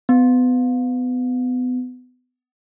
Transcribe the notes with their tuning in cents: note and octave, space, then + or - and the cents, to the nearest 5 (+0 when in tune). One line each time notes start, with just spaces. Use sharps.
B3 +30